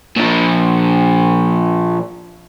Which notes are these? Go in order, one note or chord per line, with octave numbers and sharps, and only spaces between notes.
A#2 F3